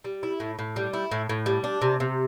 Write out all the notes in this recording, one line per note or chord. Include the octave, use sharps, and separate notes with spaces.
G3
E4
A2
A2
G3
E4
A2
A2
G3
D4
C3
C3